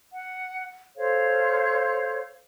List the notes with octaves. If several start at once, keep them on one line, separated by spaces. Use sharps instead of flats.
F#5
A4 C5 C#5 F5